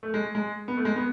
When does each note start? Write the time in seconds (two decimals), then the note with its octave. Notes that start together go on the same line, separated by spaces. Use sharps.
0.03 A3
0.14 G#3
0.35 G#3
0.68 B3
0.77 A3
0.85 G#3
0.96 B3